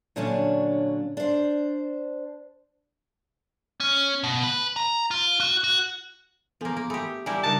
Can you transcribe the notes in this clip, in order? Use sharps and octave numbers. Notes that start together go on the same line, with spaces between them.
A#2 D3 F#3 C#4 D4
D4 C5
C#4
B2
B4
A#5
F4
F#4
F#4
F3 A#3 B3 A4 G#5
A#3
A3 G4 G#5 B5 D#6
G3 A#3 E4 G#5 A5
C#3 G3 D4 D#4 A#4 A5